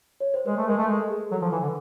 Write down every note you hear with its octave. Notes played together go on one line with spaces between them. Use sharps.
C#5
C5
G#3 B4
A3
G#3 A#4
A3
G#3 A4
G#4
F#3 A4
F3
E3
D3